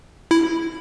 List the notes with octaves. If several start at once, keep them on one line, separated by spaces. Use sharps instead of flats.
E4